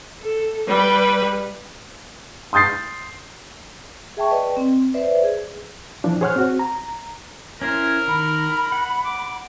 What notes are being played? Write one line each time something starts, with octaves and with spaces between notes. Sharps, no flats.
A4
G3 B4
C6 D#6 G6 A6 C7
G#4 E5 G5 A5 C#6
B4 D5 D#5 G5
C4
B4 C5 D5 E5
G#4
E3 F3 D4
G#4 C5 C#5 F#5 F6 F#6
C4 F#4
A#5
C#4 E4 A#4 C5
D#3 B5
F#5
D6